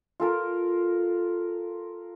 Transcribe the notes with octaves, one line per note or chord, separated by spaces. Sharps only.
F4 A4 A#4